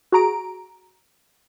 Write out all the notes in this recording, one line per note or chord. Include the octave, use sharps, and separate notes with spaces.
F#4 G#4 A#5 D7